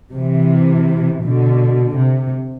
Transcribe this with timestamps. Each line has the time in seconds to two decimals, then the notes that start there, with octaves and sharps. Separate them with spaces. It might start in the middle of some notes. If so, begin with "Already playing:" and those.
0.14 C3 E3
1.24 B2 D3
1.97 C3